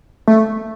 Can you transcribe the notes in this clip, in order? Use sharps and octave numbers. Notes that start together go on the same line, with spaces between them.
A3